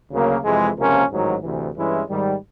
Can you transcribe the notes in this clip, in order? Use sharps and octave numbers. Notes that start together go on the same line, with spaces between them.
D2 C#3 F#3 A#3
F2 C3 E3 G#3
C#2 C3 F3 A#3 C#4
A1 G#2 D#3 F#3
D2 C3 E3
G2 E3 G#3 C#4 E4
G#2 D#3 G3